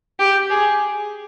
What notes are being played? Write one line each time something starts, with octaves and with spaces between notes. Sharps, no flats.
G4
G#4